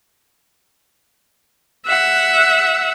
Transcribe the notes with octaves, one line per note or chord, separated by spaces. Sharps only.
E5 F#5